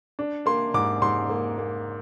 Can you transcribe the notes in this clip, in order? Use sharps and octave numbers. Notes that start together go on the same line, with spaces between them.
D4
A#3 C6
G#2 D6
G#2 C6
A#3
A#3